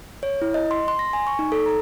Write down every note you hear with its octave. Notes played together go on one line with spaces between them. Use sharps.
C#5
E4
D#5
C6
C6
A#6
G#5
C#6
D#4
A4
A#5